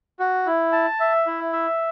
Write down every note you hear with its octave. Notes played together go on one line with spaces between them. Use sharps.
F#4
E4
A5
E5
E4
E5